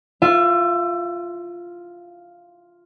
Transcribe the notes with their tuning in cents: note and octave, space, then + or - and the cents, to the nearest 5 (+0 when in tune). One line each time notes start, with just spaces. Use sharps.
F4 +0 E5 +25